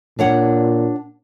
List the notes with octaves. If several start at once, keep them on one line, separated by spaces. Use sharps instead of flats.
A#2 D4 C#5 F#5